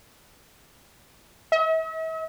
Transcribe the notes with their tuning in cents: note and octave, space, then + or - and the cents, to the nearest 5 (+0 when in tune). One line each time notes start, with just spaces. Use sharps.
E5 -45